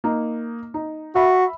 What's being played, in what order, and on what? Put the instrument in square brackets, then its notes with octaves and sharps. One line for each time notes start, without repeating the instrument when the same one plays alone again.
[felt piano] A#3 D#4
D#4
[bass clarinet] F#4 [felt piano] E5 B5